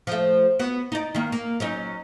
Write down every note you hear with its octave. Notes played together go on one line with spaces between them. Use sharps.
F3 A3
B3 F#4
D#4 D5
D#3 A#3
A#3
F#3 C#4 D#4